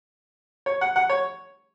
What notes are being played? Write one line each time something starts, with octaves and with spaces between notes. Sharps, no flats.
C#5
F#5
F#5
C#5